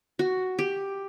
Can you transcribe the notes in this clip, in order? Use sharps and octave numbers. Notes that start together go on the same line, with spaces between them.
F#4
G4